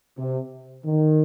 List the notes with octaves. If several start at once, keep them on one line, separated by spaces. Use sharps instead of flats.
C3
D#3